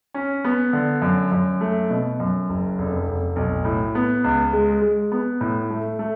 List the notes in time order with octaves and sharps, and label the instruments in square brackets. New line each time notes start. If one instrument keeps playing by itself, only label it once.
[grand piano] C#4
B3
D3
F#2
F#2
A3
B2
F#2
F#1
F1
F1
B1
A2
B3
C#2
G#3
G#3
B3
A2
A3
A3